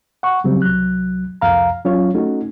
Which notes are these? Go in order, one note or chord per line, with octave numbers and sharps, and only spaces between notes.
F#5 C#6
C#3 F#3 G3 C4
C2 F#3 F#6
C2 F2 F5 A#5
F#3 C#4 F4 C#5
A3 C#4 D#4 F#4